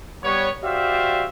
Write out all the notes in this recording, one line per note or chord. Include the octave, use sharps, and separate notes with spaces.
G3 B3 C#5
F#4 G4 C5 D5 E5 F5